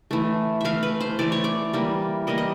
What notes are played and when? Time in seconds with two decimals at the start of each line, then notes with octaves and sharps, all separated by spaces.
0.11 E3 A3
0.61 E3 A3 E5 F5
0.83 B4
1.01 C5
1.19 E3 A3 D5
1.32 C#5
1.44 D5
1.73 E3 G3 A#3
2.27 E3 G3 A#3 D#5
2.38 D#5